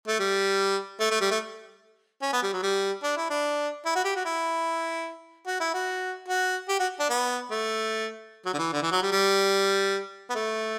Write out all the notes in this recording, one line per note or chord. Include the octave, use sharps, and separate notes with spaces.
A3
G3
A3
A3
G3
A3
C#4
B3
G3
F#3
G3
D4
E4
D4
E4
F#4
G4
F#4
E4
F#4
E4
F#4
F#4
G4
F#4
D4
B3
A3
F#3
D3
E3
D3
E3
F#3
G3
G3
B3
A3